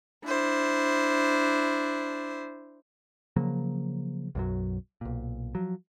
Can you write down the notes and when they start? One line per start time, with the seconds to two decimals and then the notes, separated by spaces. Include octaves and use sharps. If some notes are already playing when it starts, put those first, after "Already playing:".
0.25 D4 E4 C5
3.36 C#3 F3 F#3 A#3
4.35 B1 F#2 F#3
5.01 B1 A#2
5.55 F3 F#3